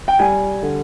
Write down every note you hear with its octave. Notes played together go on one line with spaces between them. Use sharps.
G5
G3 G#5
D3